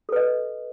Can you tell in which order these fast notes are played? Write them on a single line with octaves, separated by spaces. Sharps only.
A4 B4 D#5